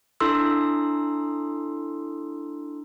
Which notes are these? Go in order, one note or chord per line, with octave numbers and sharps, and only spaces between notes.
D4 E4 A4 C6 E6